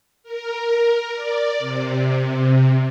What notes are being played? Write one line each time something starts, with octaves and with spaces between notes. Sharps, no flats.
A#4
D5
C3